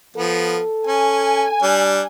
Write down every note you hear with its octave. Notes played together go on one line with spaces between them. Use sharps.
F3 B3 A4
C#4 G#5
G3 D4